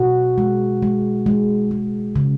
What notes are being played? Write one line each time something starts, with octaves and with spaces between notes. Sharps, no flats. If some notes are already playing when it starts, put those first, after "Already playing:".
Already playing: B2 F#4
G#3
G#3
G#3
G#3
C#3